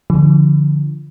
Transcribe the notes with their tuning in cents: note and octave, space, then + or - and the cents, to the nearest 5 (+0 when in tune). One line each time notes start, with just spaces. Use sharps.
D3 +0 F3 -15